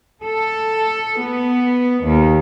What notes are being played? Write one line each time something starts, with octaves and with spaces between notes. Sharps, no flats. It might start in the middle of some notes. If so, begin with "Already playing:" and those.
A4
B3
D#2